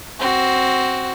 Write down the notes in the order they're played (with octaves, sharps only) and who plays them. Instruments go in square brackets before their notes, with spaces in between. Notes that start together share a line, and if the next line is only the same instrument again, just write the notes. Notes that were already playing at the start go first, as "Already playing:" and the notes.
[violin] C4 F#4